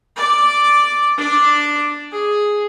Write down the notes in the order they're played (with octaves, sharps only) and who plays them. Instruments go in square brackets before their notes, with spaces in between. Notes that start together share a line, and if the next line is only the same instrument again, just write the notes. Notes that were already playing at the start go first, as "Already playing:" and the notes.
[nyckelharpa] D5 D6
D4 D5
G#4